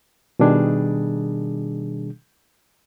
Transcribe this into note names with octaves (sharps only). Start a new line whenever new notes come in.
B2 D#3 G3 D4 G#4